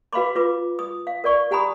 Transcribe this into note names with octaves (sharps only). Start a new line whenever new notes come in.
F#4 B4 F5 B5 C6 D6
F4 B4 D6
D#6
F5
A#4 D5 C#6
G4 F#5 G#5 A#5 B5 D#6